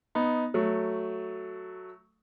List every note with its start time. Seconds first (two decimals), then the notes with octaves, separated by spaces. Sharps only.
0.15 B3 D#4
0.54 F#3 A3